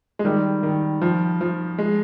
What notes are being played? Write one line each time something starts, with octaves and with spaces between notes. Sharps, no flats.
G#3
D#3 G3
D#3
F3
F3
G#3